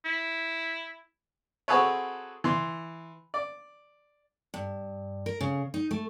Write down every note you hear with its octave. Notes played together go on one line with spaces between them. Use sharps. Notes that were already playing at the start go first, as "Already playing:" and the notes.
E4
C4 F#4 G#4 A4 B4 C#5
E3 C6
D5
G2
A#4
C#3
D#4
A3